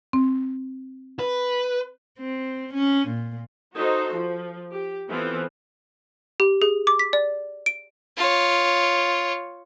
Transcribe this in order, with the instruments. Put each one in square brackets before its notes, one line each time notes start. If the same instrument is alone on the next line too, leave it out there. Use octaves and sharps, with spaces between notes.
[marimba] C4
[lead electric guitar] B4
[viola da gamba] C4
C#4
A#2
[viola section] D#4 F#4 A4 C5
F3
G4
E3 B3 C4 F4 A4 C5
[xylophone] G4
G#4
D6
B6
D5
D7
[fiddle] F4 C#5